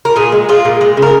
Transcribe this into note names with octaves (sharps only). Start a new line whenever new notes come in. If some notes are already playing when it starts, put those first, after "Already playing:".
A#4
A#2 G#4
G#3
G#3 F4
A#2
G#3
C#3
A#4